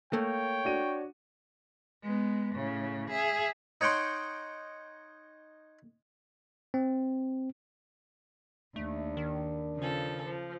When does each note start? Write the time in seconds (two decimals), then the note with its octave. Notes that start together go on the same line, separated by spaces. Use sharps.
0.13 A3 A#3 C#5 G5
0.65 D4 F#4 D#7
2.03 G#3 B3
2.55 A2 C#3
3.10 G#4 E5
3.81 D#4 C#5 F#5 G5 C6
6.74 C4
8.76 D#2 A3 D4
9.17 D#3
9.78 C#3 F3 A4
10.24 F3